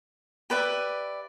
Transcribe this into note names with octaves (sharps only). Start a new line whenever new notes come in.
G4 B4 D5 E5